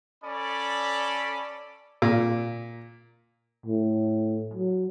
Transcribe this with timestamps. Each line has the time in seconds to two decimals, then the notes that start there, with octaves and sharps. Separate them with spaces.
0.23 C#4 A4 D5 B5
2.02 A#2
3.66 A2
4.53 F#3